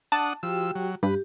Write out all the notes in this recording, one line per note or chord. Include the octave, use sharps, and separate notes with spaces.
D4 F#5 A5 D#6
F3 F#4 G4 G5 E6
F#3
G2 G4 B4